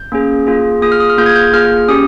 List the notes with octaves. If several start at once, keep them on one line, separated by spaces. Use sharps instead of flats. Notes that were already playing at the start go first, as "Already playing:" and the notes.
Already playing: G6
A#3 C#4 G#4
A#3 F4 G#4
A#3 F4 G#4 D#6
F6
D#6
F6
A#3 F4 G#4 G6
G#6
G6
A#3 F4 G#4 F6
C#4 G4 D#6